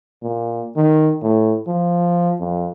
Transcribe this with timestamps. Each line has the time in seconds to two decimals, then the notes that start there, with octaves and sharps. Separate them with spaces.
0.23 A#2
0.76 D#3
1.22 A2
1.67 F3
2.40 F2